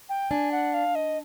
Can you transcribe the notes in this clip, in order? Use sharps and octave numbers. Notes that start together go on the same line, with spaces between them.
G5
D4 G#5
F#5
F5
D#5